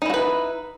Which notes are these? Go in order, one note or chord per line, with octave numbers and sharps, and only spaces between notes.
D#4 E4 F#4 B4